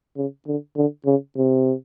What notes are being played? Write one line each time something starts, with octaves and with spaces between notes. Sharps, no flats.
C#3
D3
D3
C#3
C3